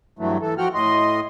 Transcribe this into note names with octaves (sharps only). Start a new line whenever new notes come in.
G2 E3 F#3 A3
E3 A4
F3 F#4 F#5 G5 F6
A2 D#5 C6